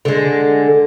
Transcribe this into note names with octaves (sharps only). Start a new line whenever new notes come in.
D3 G#3